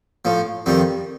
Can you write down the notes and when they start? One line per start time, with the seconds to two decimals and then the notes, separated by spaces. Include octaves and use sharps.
0.25 A2 F3
0.66 F2 D#3 G3